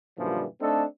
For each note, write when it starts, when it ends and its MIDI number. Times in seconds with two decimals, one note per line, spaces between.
0.18 0.44 42
0.18 0.44 46
0.18 0.44 50
0.18 0.44 52
0.18 0.44 53
0.18 0.44 55
0.60 0.84 57
0.60 0.84 60
0.60 0.84 62
0.60 0.84 63
0.60 0.84 69